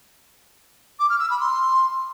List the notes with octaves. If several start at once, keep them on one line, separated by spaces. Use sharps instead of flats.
D6
F6
E6
B5
C6